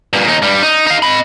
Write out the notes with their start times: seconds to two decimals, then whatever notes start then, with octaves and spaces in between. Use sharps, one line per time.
0.13 G2 A#2
0.28 D#2 D#4
0.42 G2 G3
0.63 D#4
0.86 D#4 F5
1.02 D#5 B5